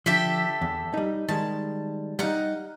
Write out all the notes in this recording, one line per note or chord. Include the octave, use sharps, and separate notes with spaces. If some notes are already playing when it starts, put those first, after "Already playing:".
D3 F3 G4 A4 E5
E2
G3 D#4
D#3 G3 G#3 A5
G3 D#4 F5 F#5 A#5